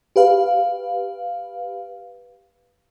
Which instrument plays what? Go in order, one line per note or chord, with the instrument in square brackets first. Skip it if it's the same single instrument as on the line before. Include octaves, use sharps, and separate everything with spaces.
[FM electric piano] G4 B4 F5